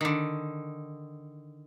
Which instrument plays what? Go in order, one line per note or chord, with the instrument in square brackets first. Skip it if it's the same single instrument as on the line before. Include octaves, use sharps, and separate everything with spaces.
[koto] D3 D#3